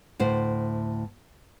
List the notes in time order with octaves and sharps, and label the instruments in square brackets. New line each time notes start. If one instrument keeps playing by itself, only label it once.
[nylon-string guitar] D2 A2 C5